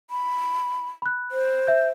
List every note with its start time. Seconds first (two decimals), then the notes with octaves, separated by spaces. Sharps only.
0.10 B5
1.02 B5 F#6
1.32 C5
1.67 E5 G6